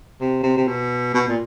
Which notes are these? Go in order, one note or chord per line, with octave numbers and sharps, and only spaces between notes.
C3
C3
C3
B2
B2
A#2